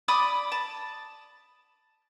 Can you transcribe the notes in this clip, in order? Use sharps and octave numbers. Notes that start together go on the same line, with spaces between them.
D5 B5 D#6
A5